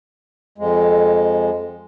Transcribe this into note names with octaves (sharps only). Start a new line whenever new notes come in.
F2 G#3